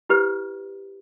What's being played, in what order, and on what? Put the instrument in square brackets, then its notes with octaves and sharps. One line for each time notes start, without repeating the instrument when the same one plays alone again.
[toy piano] E4 G4 B4 C5